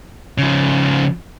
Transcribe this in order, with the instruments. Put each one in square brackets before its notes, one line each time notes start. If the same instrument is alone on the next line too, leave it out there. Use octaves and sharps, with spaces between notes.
[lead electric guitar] C#3 F3